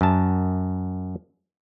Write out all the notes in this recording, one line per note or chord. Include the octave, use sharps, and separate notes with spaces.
F#2 A5